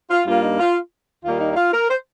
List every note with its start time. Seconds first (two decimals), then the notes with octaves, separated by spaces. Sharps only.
0.11 F4
0.26 G2 G3 A#3 F4
0.42 D#4
0.59 F4
1.25 D#2 D#3 G3 A#3 F4
1.40 D#4
1.51 D#4
1.56 F4
1.73 A#4
1.90 C5